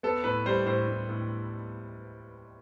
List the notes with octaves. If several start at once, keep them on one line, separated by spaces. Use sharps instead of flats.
B3 A4
A2 B4
G3 C5
A2 C5
A2
A2